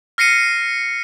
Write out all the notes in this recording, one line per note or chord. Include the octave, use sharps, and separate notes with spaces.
F6 A#6 C7 C#7 D#7